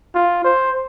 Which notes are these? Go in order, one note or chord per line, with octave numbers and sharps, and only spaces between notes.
F4
C5